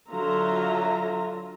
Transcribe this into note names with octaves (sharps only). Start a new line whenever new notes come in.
D3 F#3 F4 E5 A#5